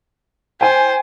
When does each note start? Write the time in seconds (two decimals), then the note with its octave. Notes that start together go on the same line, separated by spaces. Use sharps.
0.61 C5 G5 G#5